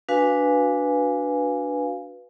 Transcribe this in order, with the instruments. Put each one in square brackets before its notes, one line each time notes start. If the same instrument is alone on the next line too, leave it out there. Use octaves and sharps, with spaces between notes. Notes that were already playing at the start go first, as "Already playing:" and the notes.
[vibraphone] D4 F#4 B4 F5 G#5